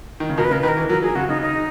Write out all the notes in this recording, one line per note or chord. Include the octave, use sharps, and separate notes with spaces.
D#3
C#3
B2 A#4
B4
C#3 A#4
B4
D#3
A#4
E3
F#3 A#4
F#3 G#4
C#3 F#4
C#3 D#4
D#4